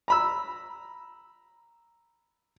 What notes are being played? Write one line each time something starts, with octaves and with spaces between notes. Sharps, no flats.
A#5 B5 E6